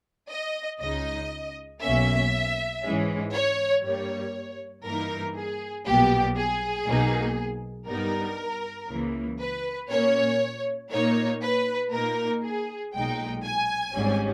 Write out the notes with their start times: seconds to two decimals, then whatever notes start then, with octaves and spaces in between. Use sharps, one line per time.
0.30 D#5
0.80 C#2 C#3 G#3 D#4 D#5
1.82 B1 B2 A#3 C#4 E5
2.83 G#2 E3 G#3 C#4
3.34 C#5
3.83 G2 G3 A#3 C#5
4.85 G2 E3 A#3 D#4 A#4
5.36 G#4
5.86 B1 A#2 G3 B3 G4
6.37 G#4
6.87 B1 B2 A#3 D#4
7.88 G2 G3 B3 D#4 A#4
8.89 C#2 C#3 E3 A#3
9.40 B4
9.90 A#2 A#3 C#4 C#5
10.91 A#2 A#3 D#4 C#5
11.42 B4
11.92 A#2 A#3 D#4 A#4
12.43 G#4
12.93 B1 A#2 G#3 D#4 G5
13.44 G#5
13.94 G#1 G#2 G3 C#4